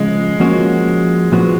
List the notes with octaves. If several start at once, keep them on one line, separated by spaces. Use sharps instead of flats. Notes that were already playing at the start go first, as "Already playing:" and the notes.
Already playing: C#3 F3 G#3 B3
F3 A#3 C#4 F#4 C#5
A#2 F3 B3 F#4